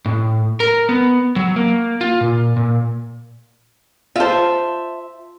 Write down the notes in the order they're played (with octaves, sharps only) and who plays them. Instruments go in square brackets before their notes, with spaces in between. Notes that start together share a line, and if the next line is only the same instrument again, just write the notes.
[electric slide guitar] A2
A#4
B3
F#3
A#3
F4
A#2
A#2
[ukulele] F4 C5 [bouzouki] E5 A5